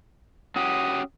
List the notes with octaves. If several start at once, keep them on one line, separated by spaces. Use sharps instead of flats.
C#4 F#4 G4 D#6